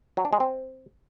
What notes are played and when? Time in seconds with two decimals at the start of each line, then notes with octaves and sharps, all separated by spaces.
0.17 F#3
0.25 D4
0.33 G#3
0.40 C4